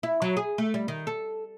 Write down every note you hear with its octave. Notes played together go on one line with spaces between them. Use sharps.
E4
F#3
G#4
A3
G3
D#3
A4